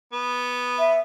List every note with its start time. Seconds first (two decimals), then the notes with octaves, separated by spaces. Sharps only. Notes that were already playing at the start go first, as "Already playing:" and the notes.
0.13 B3
0.79 E5